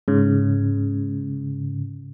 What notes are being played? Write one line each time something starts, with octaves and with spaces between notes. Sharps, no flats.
G#2 C#3